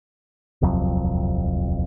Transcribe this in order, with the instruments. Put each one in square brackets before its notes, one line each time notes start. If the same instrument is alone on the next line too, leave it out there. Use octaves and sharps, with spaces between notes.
[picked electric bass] D#1 C2 F2 F#3